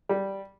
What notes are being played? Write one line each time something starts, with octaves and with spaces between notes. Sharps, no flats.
G3